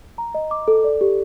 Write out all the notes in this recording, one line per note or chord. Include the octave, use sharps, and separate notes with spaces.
A#5
D#5
D6
A4
D5
G4